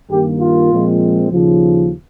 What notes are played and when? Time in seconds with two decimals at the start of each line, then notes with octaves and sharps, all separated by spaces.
0.11 G2 D#3 A#3 G4
0.41 F4
0.71 A#2 F3 G#3 C4
1.32 D#2 C#3 F3